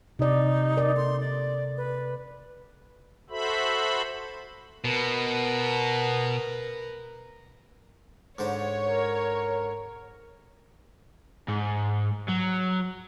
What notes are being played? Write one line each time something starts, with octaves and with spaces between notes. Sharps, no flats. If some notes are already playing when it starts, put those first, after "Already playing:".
C3 D#4 D5
A#4 D5
A4 C6
D5
B4
F#4 A4 C5 E5 B5
B2 A#4 B4
G#2 D3 C5 C#5
A#4
G#2
F#3